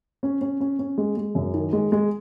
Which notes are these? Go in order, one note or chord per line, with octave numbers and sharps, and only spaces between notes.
C#4
C#4
C#4
C#4
G#3
G#3
F#2
D#3
G#3
G#3